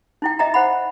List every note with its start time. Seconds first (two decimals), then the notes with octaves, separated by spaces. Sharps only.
0.22 D#4 E4 G5
0.39 D#5 E5 G5 A#5
0.54 C5 F#5 B5